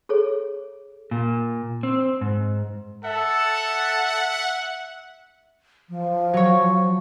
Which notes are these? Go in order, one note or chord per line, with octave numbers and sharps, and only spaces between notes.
G#4 A4 C#5
A#2
C4
G#2
A4 E5 F#5
F3
F#3 C#5